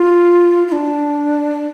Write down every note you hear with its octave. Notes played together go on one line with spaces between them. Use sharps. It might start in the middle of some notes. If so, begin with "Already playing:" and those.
Already playing: F4
F4
D4